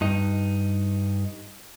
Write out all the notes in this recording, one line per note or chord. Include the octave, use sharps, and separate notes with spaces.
G2 D#4